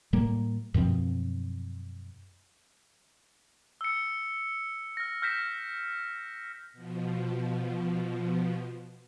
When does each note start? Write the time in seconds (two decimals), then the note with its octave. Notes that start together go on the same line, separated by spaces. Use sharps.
0.13 A2 G3 A#3
0.74 F#2 B2 F3 C4
3.81 E6 C#7
4.97 F6 A#6
5.22 F6 G6 A#6 B6 E7
6.73 B2 F3